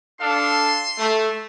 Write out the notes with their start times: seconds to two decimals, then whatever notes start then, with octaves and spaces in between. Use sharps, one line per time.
0.21 D4 A4 F5 C6
0.98 A3